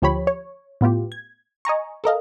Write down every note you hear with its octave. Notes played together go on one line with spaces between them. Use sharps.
D2 F3 G4 C#5 B5
C#5
A2 B3 F4 G4
G#6
D#5 G#5 A#5 C#6
A4 A#4 D#5 F5